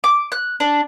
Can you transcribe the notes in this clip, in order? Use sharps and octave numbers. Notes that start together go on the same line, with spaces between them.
D6
F#6
D4